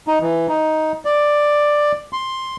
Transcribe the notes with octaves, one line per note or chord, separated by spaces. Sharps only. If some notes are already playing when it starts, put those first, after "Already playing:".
D#4
E3
D#4
D5
C6